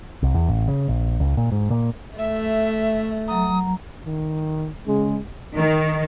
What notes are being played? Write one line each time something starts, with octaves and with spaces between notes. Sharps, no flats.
C2
E2
A1
C#3
A#1
C#2
A#2
G#2
A#2
A3 E5
F#3 A#5 D#6
D#3
C#3 G#3
D#3